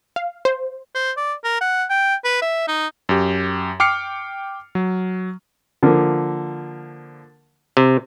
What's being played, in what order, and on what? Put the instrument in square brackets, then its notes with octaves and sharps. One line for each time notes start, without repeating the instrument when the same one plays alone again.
[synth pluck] F5
C5
[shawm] C5
D5
A#4
F#5
G5
B4
E5
D#4
[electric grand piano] F#2 G4
G5 D6 F6 C7 C#7
F#3
[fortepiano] D3 F3 A#3
[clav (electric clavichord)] C3